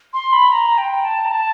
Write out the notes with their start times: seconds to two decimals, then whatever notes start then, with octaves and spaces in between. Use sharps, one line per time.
0.13 C6
0.33 B5
0.52 A#5
0.78 G5
1.03 A5
1.25 A#5
1.29 A5